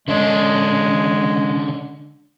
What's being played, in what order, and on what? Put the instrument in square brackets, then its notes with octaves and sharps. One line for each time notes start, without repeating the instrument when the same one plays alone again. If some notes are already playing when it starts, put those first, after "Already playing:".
[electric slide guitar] D3 C#4 D4 [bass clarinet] G#3